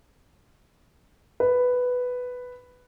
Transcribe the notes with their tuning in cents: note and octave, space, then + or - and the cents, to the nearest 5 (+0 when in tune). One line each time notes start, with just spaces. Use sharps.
B4 +5